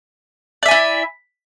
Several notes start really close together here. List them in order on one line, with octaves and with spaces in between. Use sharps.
D5 E5 G#5 E4